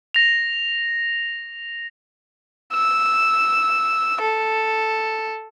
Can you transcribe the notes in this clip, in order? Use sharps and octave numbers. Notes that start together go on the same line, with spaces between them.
A#6 F7
E6
A4